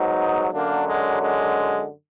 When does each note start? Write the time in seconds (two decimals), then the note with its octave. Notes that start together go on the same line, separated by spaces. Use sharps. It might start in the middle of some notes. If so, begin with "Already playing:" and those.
Already playing: G#2 F#3 B3 D#4
0.52 F#2 D3 F#3 A#3 D4
0.87 G#3
1.22 G#3